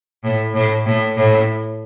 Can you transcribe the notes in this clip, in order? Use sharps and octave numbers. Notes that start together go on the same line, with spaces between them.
A2
A2
A2
A2